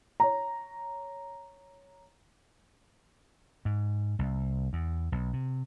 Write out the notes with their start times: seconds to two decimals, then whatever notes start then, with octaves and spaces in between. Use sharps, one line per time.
0.20 C#5 A#5
3.65 G#2
4.19 C2
4.73 E2
5.12 B1
5.33 C3